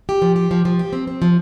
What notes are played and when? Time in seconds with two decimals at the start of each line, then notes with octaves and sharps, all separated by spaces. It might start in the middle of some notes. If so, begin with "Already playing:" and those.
0.09 G4
0.22 F3
0.36 G4
0.51 F3
0.65 F3
0.79 G4
0.93 C4
1.07 C4
1.22 F3